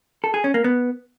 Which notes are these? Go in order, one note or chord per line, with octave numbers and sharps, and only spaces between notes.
A4
G#4
C#4
A#3
B3